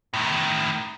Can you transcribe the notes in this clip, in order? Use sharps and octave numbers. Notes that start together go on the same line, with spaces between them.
A2 D#3